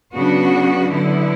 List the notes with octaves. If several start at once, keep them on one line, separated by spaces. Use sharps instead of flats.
C#3 F#3 B3 D4 F#4
D3 F#3 B3 E4